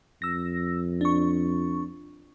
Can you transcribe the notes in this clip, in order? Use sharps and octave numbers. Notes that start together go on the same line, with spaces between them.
F2 E6 A#6
D4 C#6